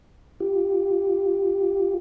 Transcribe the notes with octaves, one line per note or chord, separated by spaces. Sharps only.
F4 G4